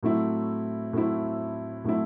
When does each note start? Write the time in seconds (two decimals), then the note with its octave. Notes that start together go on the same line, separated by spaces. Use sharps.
0.03 A2 F#3 A3 C4 E4
0.93 A2 F#3 A3 C4 E4
1.84 A2 F#3 A3 C4 E4